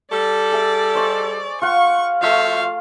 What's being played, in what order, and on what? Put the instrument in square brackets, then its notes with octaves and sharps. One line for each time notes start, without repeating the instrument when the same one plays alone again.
[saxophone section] G3 A4 [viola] D5
[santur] G#4 E5
C5 C#5 D#5
[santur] F4 F5 F#5 [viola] C#6
[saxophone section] F3 F#4 E5 [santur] A3 F4 [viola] F5